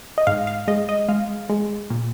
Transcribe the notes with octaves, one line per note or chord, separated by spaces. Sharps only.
D#5
G#2 F5
F5
G#3 D#5
D#5
G#3 F5
G#3
A#2